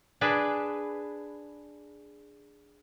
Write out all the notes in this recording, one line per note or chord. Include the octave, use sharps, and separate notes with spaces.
D4 G#4 B4